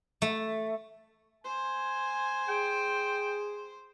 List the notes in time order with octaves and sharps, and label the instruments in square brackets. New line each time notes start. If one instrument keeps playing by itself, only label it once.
[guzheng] A3
[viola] C5 [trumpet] G#5
[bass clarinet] G#4 [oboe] G5